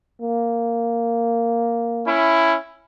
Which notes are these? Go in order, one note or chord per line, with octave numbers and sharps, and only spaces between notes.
A#3
C#4 E4